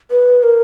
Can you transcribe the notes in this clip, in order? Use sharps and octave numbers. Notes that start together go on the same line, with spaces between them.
B4
A#4